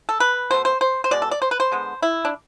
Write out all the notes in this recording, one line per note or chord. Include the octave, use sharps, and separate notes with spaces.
A4
B4
B2 A3 C5
C5
C5
C5
B2 G#3 D5
A4
D5
C5
B4
C5
D3 G#3 B3
E4
D4